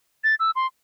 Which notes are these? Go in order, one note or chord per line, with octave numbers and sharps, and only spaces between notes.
A6
E6
C6